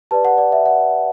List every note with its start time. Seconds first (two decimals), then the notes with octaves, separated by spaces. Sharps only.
0.11 G4 B4 D5 A5
0.25 F#5
0.38 D5
0.52 E5
0.66 F#5